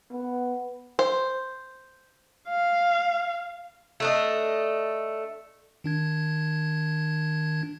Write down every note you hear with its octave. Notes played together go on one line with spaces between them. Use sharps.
B3
C5
F5
A3 D4 D#5
D#3 D4 G#6